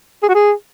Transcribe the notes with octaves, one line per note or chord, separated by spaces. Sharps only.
G#4
F#4
G#4